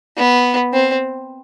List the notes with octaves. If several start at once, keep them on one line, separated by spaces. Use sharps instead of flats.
B3
C4